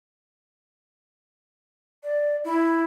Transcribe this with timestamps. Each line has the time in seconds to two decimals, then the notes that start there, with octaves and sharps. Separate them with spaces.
2.03 D5
2.44 E4